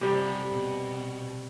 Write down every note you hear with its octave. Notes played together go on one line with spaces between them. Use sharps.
C3 G3 G4 A4
B2